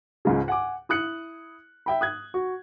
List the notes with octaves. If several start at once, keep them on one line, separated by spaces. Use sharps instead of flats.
C#2 G#2 C#3
F#5 G#5 D6
E4 D#6 F#6 C#7
E5 G5 B5
D#6 F#6 G#6
F#4